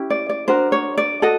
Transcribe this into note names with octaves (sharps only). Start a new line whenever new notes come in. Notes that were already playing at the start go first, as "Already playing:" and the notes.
Already playing: C#4 E4 G4
D5
D5
D4 F#4 A#4 C5
C#5
D5
F#4 A4 D#5